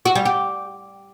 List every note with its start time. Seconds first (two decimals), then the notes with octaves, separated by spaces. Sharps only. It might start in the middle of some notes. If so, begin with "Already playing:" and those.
0.05 F#4
0.15 G3
0.25 G4